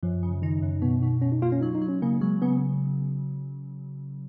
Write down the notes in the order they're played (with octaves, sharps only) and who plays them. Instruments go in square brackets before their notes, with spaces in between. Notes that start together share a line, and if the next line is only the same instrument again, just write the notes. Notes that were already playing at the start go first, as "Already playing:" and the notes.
[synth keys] F#2 [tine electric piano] F3
[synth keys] C#3
[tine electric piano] D#3 [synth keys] D#4
[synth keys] F#2
[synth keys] B2 [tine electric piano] B3
[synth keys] B2 [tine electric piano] D#4
[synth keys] B2 [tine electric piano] C#4
[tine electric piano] D#4
[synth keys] A#3 [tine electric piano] F4
[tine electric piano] C#4
[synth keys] F#3 [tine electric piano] D#4
[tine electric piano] D#4
[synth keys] F#3
[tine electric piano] C#4
[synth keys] C#3 [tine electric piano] A#3
[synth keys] F#3 [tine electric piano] G#3
[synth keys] C#3 [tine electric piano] B3